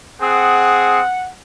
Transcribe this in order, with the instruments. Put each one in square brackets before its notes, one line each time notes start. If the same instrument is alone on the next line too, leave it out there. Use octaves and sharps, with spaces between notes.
[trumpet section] C4 G#4 D#6 [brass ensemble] F#5